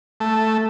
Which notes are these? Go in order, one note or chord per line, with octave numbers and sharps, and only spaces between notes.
A3